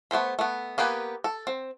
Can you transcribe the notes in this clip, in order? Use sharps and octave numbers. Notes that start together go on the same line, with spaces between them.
A3 B3 C5 B5
A3 B3
A#3 B3 G4 B4 G#5
A4
C4